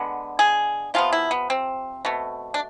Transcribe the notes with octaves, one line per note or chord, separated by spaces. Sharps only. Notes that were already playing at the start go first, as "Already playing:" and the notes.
Already playing: D3 G#3 B3
G#4
C3 F3 G#3 B3 F4
E4
B3
C4
B2 A3
D4